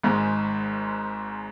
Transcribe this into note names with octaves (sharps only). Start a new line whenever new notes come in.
G#1 G#2 G#3